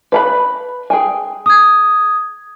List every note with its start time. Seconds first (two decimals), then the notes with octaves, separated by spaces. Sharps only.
0.12 B4 A#5 B5
0.90 G#4 G5 G#5
1.46 D#6 G#6